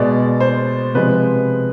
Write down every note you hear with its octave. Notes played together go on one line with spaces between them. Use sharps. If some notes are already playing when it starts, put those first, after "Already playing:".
Already playing: B2 G#3 D5
C5
C3 F3 G#3 B4